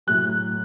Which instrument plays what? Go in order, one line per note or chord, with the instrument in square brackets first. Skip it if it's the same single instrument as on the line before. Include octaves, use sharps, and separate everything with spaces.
[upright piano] A2 F#3 F#6